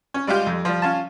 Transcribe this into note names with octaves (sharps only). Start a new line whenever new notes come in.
C#4
G3 G#3 F4 G4
F2
F3 G3
C#4 F4 A5